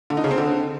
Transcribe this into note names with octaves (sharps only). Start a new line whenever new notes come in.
D3
D#4
C#3
C4
D3